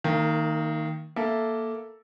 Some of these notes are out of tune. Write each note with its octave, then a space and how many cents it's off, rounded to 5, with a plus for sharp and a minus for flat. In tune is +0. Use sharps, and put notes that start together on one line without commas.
D#3 +5 A#3 -30 F5 -5
A#3 +0 A4 +0 E5 +0